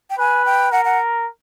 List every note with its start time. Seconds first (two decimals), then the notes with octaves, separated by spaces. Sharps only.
0.10 G5
0.18 B4 G#5
0.45 G5
0.72 A#4 F#5
0.85 F#5